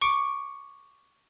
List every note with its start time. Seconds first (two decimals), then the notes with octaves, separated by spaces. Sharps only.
0.01 C#6 D6 C#7 D7